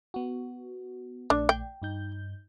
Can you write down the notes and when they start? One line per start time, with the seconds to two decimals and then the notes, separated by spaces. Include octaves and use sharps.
0.14 B3 F#4
1.30 A#1 A3 D4 D5
1.49 G5
1.82 G2 D#4 G6